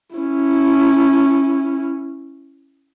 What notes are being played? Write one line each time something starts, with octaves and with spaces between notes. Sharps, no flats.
C#4 E4